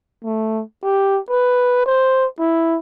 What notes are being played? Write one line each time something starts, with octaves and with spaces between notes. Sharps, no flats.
A3
G4
B4
C5
E4